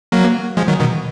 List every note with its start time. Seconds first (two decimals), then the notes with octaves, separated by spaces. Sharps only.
0.12 F#3 A#3
0.57 F3 G#3
0.68 D#3 F#3
0.80 B2 D#3